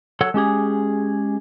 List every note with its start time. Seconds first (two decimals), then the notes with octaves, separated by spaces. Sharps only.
0.21 F#3 A4 C#5 F#5
0.34 G#3 C#4 G4 G#4